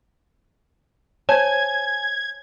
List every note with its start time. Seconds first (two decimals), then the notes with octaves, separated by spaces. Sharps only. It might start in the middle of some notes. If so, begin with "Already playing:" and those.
1.29 C5 C#5 G#5 A5 G#6